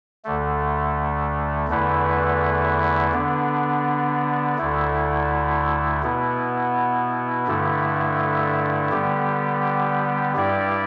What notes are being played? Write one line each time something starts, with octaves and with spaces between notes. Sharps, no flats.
D2 D3 A3
E2 D3 A3 E4 B4
D3 B3 D4
D2 D3 A3 E4
B2 B3 E4
G2 D3 A3 E4
D3 G3 B3 G4
G2 G3 E4 G4 D5